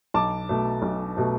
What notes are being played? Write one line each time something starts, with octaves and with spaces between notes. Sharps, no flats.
B1 A5 D6
B2 A3
B1
B2 A3